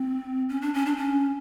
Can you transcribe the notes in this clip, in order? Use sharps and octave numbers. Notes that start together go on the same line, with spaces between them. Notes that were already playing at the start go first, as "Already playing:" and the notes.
Already playing: C4
C#4
D4
C#4
D4
C#4